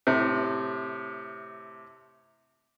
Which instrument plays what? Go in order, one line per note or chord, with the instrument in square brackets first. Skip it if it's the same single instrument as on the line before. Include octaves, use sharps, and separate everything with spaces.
[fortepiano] A2 C3